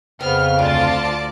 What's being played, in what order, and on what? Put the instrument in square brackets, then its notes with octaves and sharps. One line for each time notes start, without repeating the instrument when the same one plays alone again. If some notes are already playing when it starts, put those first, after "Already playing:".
[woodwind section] F2 C#3 [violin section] B3 F6 [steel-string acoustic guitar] C4
[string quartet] D2 D5 [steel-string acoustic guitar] D4 [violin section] F4 A5